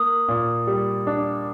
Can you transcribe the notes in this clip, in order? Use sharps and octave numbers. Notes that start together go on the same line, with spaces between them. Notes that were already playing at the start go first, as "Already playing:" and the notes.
Already playing: A#3 D#6
A#2
G3
D4